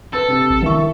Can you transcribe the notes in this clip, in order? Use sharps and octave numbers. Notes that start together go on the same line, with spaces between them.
A4 B4 A6
C3
A1
D#3 E4 E5 C#6